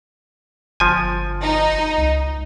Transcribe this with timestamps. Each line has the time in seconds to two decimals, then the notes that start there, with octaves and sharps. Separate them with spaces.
0.80 G1 F3 G#5
1.43 D#4
1.98 C#2